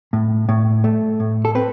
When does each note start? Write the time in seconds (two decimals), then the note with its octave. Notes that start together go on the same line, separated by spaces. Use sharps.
0.13 A2
0.49 A2
0.84 A3
1.20 A2
1.45 A4
1.55 C4 B4